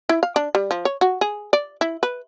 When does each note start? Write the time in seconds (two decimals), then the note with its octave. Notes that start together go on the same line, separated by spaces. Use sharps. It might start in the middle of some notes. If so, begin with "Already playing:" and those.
0.09 E4
0.23 F5
0.36 D4
0.55 G3
0.71 F3
0.85 C#5
1.01 F#4
1.21 G#4
1.53 D5
1.81 E4
2.03 B4